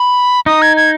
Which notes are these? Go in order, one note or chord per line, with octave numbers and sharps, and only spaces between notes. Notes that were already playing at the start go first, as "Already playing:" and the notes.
Already playing: B5
D#4 D#6
G#6
G#6